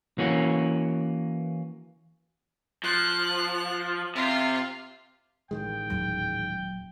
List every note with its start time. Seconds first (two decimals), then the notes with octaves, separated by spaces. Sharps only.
0.18 E3 A#3 C#4 F#4
2.84 F3 F#6
4.15 C3 F4
5.51 A1 D#3 G#3 G5
5.90 D#1 F#3